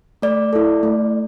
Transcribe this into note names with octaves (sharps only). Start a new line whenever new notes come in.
A3 D5
E4 A4
A3